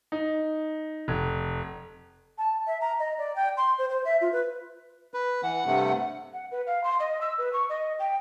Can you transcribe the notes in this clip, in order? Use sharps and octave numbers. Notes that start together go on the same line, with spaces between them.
D#4
F1
A5
E5
A#5
D#5
D5
G5
C6
C5
C5
E5
F4
B4
B4
E3 F#5
G2 C3 A3
F#5
B4
F5
C6
D#5
E6
B4
C#6
D#5
G5